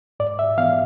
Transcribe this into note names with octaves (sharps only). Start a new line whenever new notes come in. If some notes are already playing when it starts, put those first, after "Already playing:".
G#2 D5
E5
E3 B3 F5